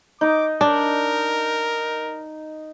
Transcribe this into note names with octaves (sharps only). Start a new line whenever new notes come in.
D#4 D6
D4 A#4